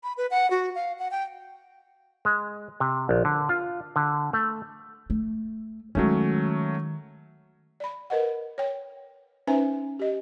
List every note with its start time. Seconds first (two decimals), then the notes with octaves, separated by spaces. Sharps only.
0.04 B5
0.17 B4
0.31 F#5
0.51 F#4
0.75 F5
0.99 F#5
1.11 G5
2.25 G#3
2.80 C3
3.09 A#1
3.25 D3
3.49 F4
3.96 D3
4.33 A3
5.10 A3
5.95 D#3 F#3 G#3 A3 C#4
7.80 D5 B5
8.10 A#4 B4 D#5 F#5
8.58 C#5 G5
9.47 C#4 D#4 B4 C5 E5 G#5
9.99 G4 D#5